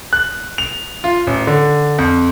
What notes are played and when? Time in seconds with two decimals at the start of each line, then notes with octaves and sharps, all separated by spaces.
0.13 F#6
0.58 F7
1.04 F4
1.27 A1
1.47 D3
1.99 F2